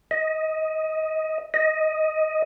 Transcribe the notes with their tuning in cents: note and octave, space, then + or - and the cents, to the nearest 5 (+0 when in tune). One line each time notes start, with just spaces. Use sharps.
D#5 +20
D#5 +10